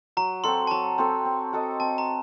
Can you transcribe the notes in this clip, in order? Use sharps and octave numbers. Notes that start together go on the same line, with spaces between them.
F#3 A#5
C4 F#4 A4 C6
A5
F#3 A#5
C4 F#4 A4
C4
F#4 A4 D#5
C4 A5
A#5